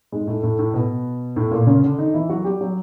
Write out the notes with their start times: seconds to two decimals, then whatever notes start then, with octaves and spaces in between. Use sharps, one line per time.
0.12 G#2 G#3
0.27 A2 A3
0.43 A2 A3
0.58 A2 A3
0.74 B2 B3
1.36 A2 A3
1.51 A#2 A#3
1.67 C#3 C#4
1.83 D3 D4
1.98 D#3 D#4
2.14 E3 E4
2.29 F#3 F#4
2.44 G3 G4
2.61 F#3 F#4